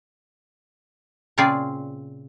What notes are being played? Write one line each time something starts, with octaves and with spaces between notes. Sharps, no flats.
A#2 C#3 C4 F4 G#4 D5